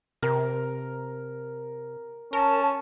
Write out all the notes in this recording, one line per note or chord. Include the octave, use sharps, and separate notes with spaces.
C3 A#4
C#4 A#4 A5